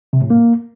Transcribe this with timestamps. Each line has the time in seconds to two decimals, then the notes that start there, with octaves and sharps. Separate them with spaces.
0.13 C3
0.22 A2
0.30 A#3